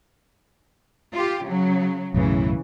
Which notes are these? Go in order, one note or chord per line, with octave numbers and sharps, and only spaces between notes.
F4 G4
C#3 F#3
B1 F#2 A2 C#3 E3